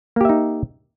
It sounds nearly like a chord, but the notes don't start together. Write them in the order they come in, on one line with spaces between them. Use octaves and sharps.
A#3 G4 E5 D#4